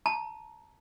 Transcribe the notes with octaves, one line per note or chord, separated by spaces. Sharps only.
A5 A#5